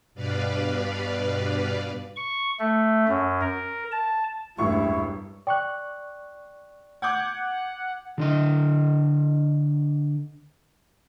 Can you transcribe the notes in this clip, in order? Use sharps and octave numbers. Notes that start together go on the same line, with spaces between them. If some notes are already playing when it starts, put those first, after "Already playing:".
G2 B2 B4 D5 F5
C#6
A3
F#2
A#4
A5
E1 A1 G2 E4 C#6
D5 G5 C#6 F#6
F#5 D6 G6 G#6
D3 D4 D#5